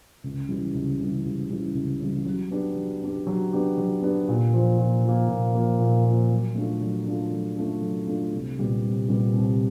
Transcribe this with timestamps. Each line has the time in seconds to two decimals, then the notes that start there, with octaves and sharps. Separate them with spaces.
0.24 C#2
0.49 C#3 E3 G3
0.74 C#2
1.00 C#3 E3 G3
1.25 C#2
1.50 C#3 E3 G3
1.75 C#2
2.00 C#3 E3 G3
2.25 F#3
2.51 B3 D4 G4
2.76 F#3
3.02 B3 D4 G4
3.27 F#3
3.53 B3 D4 G4
3.78 F#3
4.02 B3 D4 G4
4.28 A#2
4.53 F3 A#3
4.79 A#2
5.04 F3 A#3
5.29 A#2
5.55 F3 A#3
5.79 A#2
6.05 F3 A#3
6.30 F#3
6.55 A3 D4 F4 A4
6.81 F#3
7.06 A3 D4 F4 A4
7.31 F#3
7.56 A3 D4 F4 A4
7.82 F#3
8.07 A3 D4 F4 A4
8.32 C2
8.58 A#2 G3 B3
8.83 C2
9.08 A#2 G3 B3
9.34 C2